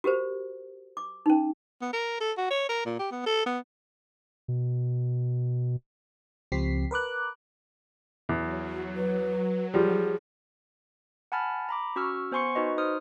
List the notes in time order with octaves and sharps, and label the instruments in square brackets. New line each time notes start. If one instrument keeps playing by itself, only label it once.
[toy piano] F#4 G4 A#4 C5
D6
C#4 D#4
[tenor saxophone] B3
A#4
A4
F#4
C#5
A#4
A#2
G4
B3
A4
B3
[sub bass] B2
[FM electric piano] C#2 F3 C4 G4 B6 C7
A#4 B4 D6 F#6
[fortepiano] E2 [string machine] F#3
[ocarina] B4
[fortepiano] F3 G3 [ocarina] G#4
[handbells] F#5 G#5 A5 B5 F6 A6
A#5 B5 D6
C#4 F#4 C#6 E6 F6
B3 C5 G#5 C6 C#6 C#7
D#4 F#4 B4 D#5
D#4 C5 C6 D#6 F6